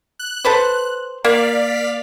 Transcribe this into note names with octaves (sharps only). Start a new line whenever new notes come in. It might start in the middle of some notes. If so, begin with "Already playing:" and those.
F#6
A4 B4 C5
A#3 D5 F5 B6